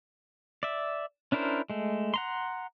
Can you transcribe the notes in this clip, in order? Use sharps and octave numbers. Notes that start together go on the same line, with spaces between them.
D5 E5
C#4 D4 E4 A#4 C5
G#3 A3
F#5 A#5 C6